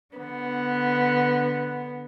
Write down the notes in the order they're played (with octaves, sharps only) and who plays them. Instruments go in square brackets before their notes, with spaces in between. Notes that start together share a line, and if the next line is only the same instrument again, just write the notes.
[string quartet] D3 B3